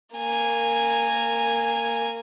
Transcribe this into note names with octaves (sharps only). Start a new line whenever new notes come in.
A#3 G#5